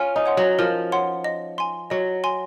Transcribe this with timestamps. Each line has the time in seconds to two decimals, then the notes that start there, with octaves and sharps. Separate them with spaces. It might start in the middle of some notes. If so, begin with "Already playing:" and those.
Already playing: C#4 F4
0.16 D#4
0.26 C#5 F#5 C6
0.37 F#3
0.59 F3 A#4
0.92 C#5 F#5 C6
1.24 D#5
1.58 G#5 C6
1.90 F#3 D#5
2.24 G#5 C6